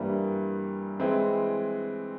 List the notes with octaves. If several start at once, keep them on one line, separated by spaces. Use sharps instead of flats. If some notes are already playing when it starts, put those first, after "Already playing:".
Already playing: G2 E3 G3 A#3
E3 G#3 C4